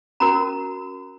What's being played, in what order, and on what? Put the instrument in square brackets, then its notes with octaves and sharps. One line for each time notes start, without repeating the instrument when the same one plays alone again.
[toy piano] C#4 F#4 A#4 A#5